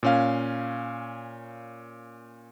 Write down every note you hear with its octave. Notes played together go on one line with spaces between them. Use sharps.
A#2 C#4 F5